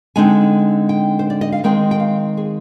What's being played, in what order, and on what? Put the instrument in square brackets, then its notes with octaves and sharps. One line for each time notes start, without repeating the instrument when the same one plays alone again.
[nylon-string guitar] D3 G#3 C4 D#4 G#5
G5
C5
D5
D#5
F5
D#3 G#3 C4 D#4 G5
G5
F5
G#4